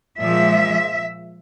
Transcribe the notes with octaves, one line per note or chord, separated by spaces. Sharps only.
A#2 F3 G#3 E5